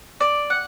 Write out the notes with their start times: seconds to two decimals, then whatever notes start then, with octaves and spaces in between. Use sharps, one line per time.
0.20 D5
0.50 F#5